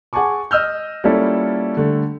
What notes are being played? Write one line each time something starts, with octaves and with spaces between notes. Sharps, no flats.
G#4 F#5 G#5 A5 C#6 D6
D#5 E6 F6 G6
G3 A#3 C#4 E4 F4 A4
D3 G3 A3